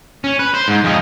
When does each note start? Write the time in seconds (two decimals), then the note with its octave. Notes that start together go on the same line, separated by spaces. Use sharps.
0.24 C#4
0.39 B4
0.54 C5
0.68 G#2
0.84 F2 D#4